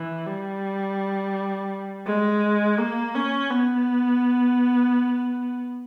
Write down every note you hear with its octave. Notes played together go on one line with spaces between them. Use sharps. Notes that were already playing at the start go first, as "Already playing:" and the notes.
Already playing: E3
G3
G#3
A#3
C#4
B3